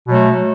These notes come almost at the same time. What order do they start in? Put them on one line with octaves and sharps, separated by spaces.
B2 F#3 A3